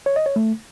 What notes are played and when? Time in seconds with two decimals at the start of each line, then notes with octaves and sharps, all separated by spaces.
0.06 C#5
0.16 D#5
0.26 C#5
0.36 A3